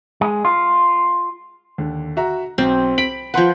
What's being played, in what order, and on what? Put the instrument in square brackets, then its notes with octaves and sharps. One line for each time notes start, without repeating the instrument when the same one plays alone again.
[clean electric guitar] G#3
F4
[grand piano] D#2 D3
F#4 E5 A#5
[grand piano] B1 [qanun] C4
[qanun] B5 [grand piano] B6 D7 F#7
[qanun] F3 B4 [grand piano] F#5 C6 G6